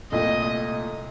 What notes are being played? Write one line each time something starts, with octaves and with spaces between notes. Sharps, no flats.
C2 A#2 A3 D#5